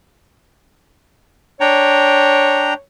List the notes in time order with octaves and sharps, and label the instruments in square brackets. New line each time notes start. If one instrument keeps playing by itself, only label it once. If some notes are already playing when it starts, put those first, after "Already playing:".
[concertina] D4 G5 A#5 [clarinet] C#5